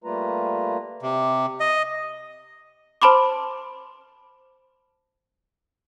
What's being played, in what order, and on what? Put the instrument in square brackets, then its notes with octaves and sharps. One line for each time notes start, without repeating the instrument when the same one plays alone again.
[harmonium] G3 A3 A#3 F4 B4 A#5
[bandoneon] C3
D#5
[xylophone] C5 A5 B5 C6 D6